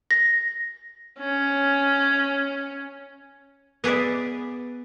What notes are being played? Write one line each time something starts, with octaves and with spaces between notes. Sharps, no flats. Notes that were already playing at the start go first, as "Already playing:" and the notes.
A#6
C#4
B3 G#4 B4 D5 E5